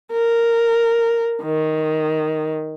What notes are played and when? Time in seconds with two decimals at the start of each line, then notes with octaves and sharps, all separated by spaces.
0.11 A#4
1.43 D#3